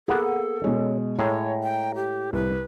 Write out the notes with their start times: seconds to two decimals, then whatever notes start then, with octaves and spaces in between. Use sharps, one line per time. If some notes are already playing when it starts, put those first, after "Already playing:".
0.08 A#3 B3 G#4 A4 F#5
0.64 B2 G#3 C#4
1.19 A2 G#3 G#4 C#5 A#5
1.63 G5
1.95 G4
2.33 C2 B4